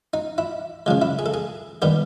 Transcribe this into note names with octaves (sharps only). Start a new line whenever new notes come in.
D#4
E4
C#3 F3 G#3
E4
G#4
A4
G#4
D#3 G3 B3 G4